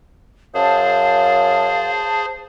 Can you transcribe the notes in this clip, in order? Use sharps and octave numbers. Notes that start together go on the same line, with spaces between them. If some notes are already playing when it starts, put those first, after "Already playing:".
F#2 G#4 C5 F5 A5